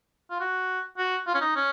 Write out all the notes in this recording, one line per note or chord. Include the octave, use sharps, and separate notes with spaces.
F4
F#4
F#4
F4
C#4
D#4
C#4